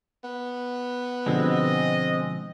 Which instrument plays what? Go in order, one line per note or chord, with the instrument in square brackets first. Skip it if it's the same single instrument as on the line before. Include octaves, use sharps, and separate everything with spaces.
[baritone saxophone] B3
[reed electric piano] B2 D3 F3 [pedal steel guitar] G#3 C4 [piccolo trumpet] D#5